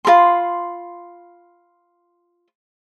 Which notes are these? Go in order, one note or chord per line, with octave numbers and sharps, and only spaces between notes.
F4 A#4 B5 C6